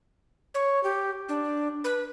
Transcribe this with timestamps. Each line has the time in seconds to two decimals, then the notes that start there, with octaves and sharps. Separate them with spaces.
0.54 C#5
0.84 G4
1.29 D4
1.84 B4